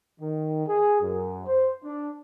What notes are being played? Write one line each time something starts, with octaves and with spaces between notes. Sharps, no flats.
D#3
G#4
F#2
C5
D4